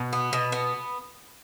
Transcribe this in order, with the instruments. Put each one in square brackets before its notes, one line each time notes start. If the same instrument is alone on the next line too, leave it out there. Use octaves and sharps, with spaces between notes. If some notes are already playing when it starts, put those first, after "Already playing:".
Already playing: [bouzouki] B2 F#4
B3
B2
B3